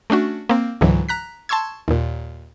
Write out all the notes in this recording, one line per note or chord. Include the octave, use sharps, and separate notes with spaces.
A3 C#4 D4 F#4
A#3 C4
C#2 G#2 D3 E3 F#3
A#5 F#6 B6
A5 C6 C#6 E6 G#6
D#2 A#2